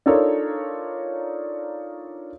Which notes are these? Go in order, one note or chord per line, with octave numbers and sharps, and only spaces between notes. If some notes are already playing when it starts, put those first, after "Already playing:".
D4 D#4 F4 A4 A#4 C#5